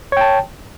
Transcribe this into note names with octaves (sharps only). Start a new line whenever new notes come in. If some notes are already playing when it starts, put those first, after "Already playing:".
C#5 G5 A5